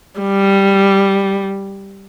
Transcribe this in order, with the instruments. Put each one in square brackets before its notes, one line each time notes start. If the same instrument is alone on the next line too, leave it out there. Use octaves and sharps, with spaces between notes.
[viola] G3